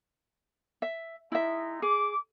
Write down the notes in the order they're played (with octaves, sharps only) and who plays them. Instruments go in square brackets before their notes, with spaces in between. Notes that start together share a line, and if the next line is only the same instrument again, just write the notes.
[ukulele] E5
[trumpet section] G#3 D#4 [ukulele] E4 E5
[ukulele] G#4 [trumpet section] D6